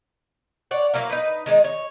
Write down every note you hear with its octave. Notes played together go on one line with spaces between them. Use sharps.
C#5 D5 F#5
F#3 A#3 E4 F5
D#4 B4
D#3 G#3 C#4 D#4
C#5